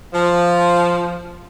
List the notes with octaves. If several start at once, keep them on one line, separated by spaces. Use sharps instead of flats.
F3